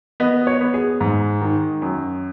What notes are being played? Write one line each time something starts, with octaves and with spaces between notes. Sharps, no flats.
B3 D#5
C#5
B3
G#4
G#2
D#3
F#2